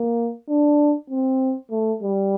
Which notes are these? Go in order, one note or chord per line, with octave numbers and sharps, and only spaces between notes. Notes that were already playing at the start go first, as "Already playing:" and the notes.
Already playing: A#3
D4
C4
A3
G3